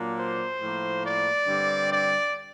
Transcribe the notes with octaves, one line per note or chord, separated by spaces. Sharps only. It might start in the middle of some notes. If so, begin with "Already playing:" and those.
Already playing: A#2 F#3 A#3 D4
C5
A2 F3 A#3
D5
G2 D3 G3 C4
D5